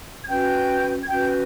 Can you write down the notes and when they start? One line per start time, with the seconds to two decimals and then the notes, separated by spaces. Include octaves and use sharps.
0.22 G#6
0.27 C#4 F#4 B4 G5 G6
1.02 G#6
1.08 C#4 F#4 B4 G5 G6